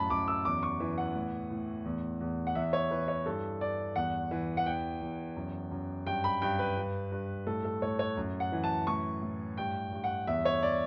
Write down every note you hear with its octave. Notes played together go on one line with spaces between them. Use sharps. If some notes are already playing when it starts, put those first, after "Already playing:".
Already playing: F#2 A2 A5 B5
F#2 D6
E6
E2 D6
C#6
E3
F#5
A2
A2
E2
E2
F#5
E2 E5
C#5
E3 B4
C#5
G2 A4
G2 D5
E2 F#5
E3
F#5
E2 G5
E2
F#2
F#2
G2 G5
B5
G2 G5
B4
G2
G2
A2 A4
A4
A2 C#5
C#5
F#2
F#5
E3
A5
A2 C#6
A2
G2 G5
G2
F#5
E2 E5
C#5
D5